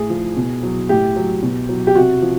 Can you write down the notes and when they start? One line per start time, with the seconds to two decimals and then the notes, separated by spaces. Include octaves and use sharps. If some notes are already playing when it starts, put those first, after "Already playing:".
Already playing: A2 G#4
0.10 F3
0.37 B2
0.63 F#3
0.89 A2 G4
1.16 F#3
1.43 B2
1.69 F#3
1.87 G4
1.95 C3 F#4
2.22 F3